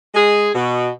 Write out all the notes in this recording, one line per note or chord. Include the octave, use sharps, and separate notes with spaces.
G#3 G#4
B2